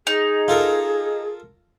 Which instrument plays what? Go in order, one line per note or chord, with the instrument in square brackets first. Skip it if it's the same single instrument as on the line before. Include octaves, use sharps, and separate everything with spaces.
[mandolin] D#4 [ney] G#4
[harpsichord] F4 A4 A#4